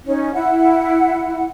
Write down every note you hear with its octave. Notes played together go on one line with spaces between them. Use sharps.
C#4 D#4
E4 F#5